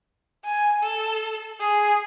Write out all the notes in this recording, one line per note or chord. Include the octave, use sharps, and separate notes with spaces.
G#5
A4
G#4